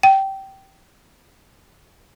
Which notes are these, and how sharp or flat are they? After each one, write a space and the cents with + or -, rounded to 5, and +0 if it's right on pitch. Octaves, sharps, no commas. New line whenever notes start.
G5 -15